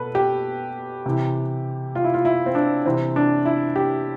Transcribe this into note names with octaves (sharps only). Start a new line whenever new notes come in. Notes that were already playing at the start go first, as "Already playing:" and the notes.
Already playing: B2 A4 B4
G4
C3 E3
F4
E4
F4
E4
C4
D4
C3 E3 C4
D4
E4
G4